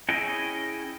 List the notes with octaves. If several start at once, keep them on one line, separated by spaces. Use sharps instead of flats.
C#4 E4 G#4 C#5 D#5 G5